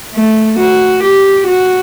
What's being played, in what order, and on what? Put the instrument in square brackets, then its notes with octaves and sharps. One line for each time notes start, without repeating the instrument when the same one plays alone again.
[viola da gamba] A3
F#4
G4
F#4